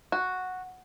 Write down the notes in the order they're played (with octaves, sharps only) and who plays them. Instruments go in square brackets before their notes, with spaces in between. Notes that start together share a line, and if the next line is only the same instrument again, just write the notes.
[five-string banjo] F#4